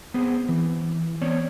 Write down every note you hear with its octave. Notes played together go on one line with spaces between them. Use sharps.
B3 C4 G#4
E3
B3 C4 C#5 D5